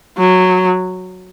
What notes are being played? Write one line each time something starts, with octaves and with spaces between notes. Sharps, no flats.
F#3